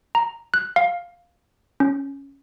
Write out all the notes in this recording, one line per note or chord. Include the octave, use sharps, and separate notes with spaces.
A#5
F#6
F5
C#4